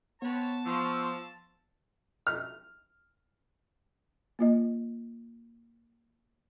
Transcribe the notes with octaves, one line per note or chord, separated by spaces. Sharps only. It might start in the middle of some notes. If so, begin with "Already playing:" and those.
B3 C4 B4 C#5 A5
F3 C6 C#6 E6
F6
A#3 F4 D#5